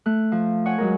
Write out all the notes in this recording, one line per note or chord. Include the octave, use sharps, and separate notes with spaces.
A3 F#6
F3
C#5 F#5 G#5
F#3 G#3 A#4